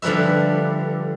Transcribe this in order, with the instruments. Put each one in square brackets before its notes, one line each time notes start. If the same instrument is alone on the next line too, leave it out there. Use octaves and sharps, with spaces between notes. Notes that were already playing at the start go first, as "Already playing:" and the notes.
[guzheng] D3 F3 G3 B4 E5